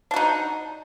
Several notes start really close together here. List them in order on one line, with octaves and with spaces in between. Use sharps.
D4 F#4 D#4